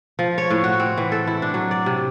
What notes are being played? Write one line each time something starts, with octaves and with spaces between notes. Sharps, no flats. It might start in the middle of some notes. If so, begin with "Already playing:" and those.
F3
C#5
A2
F#4
C4
E3
A4
E4
D4
F#3
D5
C3